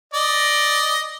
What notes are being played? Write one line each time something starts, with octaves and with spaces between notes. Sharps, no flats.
D5 D#5